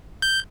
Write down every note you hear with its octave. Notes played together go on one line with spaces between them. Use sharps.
G6